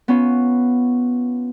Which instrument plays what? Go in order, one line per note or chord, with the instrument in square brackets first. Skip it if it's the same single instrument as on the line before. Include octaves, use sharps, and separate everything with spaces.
[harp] B3 C#4 F4